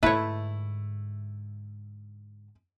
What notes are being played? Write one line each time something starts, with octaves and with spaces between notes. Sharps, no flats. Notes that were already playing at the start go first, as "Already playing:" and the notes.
G#2 D3 A3 E4 B4 C#5